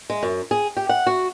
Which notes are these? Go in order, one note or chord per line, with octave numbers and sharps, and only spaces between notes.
G#3
F#2
G#4
G4
F#5
F#4